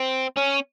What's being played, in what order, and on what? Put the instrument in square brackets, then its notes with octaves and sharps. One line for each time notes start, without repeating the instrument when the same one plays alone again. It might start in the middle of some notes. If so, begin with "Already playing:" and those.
Already playing: [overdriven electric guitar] C4
C#4